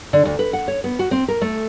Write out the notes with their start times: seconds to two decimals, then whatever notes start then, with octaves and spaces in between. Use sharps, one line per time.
0.13 D3
0.25 D2
0.39 B4
0.53 F#5
0.68 C#5
0.84 B3
0.99 F#4
1.11 C4
1.28 A#4
1.41 A3